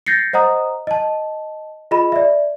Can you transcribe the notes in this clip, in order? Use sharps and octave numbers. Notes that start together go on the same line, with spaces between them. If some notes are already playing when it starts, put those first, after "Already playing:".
G6 A6 A#6 C7 C#7
C5 D#5 F#5 A#5 D#6
D#5 A5
F4 G#4 D#5 B5
D5 E5